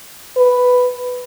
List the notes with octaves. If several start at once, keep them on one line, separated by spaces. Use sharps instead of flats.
B4